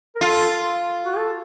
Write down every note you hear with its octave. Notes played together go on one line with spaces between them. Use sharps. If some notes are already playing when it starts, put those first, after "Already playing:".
A#4
F4 A4
F#4
A4